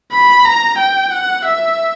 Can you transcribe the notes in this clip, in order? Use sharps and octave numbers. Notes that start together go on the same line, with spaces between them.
B5
A#5
G5
F#5
E5